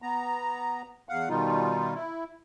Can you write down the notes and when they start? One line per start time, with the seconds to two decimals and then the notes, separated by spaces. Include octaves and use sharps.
0.02 B3 A#5
1.09 E2 F5 F#5
1.29 B2 D#3 G3 D#4 F4
1.94 E4